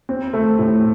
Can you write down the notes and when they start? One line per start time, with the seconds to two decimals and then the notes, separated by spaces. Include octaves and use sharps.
0.09 C4
0.33 A3
0.59 A2